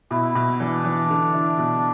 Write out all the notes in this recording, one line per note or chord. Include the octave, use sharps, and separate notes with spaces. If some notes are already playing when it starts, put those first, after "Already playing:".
B2 E4
B2
E3 D4
E3
D3
E4
B2